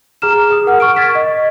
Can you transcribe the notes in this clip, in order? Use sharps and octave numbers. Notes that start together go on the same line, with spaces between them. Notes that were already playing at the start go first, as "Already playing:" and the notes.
G#4 A#5 F6 E7
G#4 D#6
A#4 F#5 F6
C#6 F6 D7
G#6 A6 B6
D#5